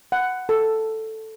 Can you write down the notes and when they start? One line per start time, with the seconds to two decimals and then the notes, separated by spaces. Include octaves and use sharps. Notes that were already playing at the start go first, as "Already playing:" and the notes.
0.12 F#5
0.49 A4